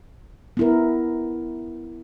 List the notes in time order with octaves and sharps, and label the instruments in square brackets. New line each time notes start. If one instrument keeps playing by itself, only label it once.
[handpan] B3 E4 A#4